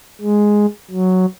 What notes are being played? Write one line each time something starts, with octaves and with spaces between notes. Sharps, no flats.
G#3
F#3